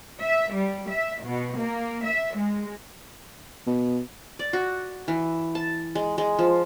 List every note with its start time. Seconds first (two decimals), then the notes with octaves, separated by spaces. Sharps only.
0.22 E5
0.54 G3
0.90 E5
1.24 B2
1.59 A#3
2.06 E5
2.37 G#3
3.67 B2
4.39 D5
4.53 F#4
5.08 E3
5.55 A5
5.95 G#3
6.18 G#3
6.39 F3